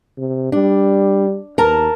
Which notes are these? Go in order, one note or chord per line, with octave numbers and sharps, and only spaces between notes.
C3
G3 D4
D#2 A#4 A5 A#5